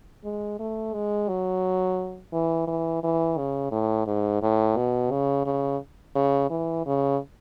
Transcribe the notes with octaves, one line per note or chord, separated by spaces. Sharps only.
G#3
A3
G#3
F#3
E3
E3
E3
C#3
A2
G#2
A2
B2
C#3
C#3
C#3
E3
C#3